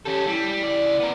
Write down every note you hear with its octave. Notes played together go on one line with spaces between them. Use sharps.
C#4 G4 A4 A5
G3 E4
C#2 D5
B3 A#4